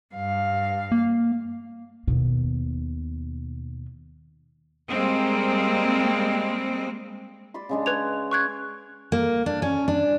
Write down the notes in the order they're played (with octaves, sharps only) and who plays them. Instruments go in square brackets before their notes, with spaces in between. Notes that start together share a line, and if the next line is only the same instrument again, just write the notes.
[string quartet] G2 F5
[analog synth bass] A#3
[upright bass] D#2 B2
[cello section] G3 G#3 A#3 C4
[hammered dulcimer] D5 B5 C6
C#3 G#3 D4
[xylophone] B4 G#6 F7 [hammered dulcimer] C#5
[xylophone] C#6 F#6 G#6
[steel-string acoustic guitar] A#3
D4
C#4
D4